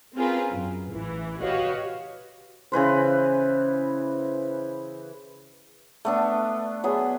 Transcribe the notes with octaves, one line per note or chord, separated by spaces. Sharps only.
C4 C#4 F4 G#4 A#4 B4
F#2
A1 E3
F#4 G4 B4 C#5 D#5 F5
C#3 E3 B4 C5
A3 B3 D4
F#3 B3 G#4